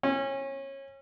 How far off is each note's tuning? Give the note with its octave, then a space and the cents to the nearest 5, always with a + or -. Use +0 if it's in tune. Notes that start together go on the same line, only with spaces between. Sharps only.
C#4 -25